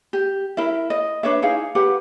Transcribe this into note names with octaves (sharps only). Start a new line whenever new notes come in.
G4
E4 A#4 E5
D#5
D4 B4 C#5 E5
D#4 E4 G#4 F5
G4 B4 F#5